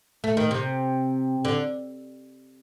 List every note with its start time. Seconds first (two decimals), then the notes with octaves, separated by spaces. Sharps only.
0.24 A3
0.37 D#3
0.51 C3
1.45 D3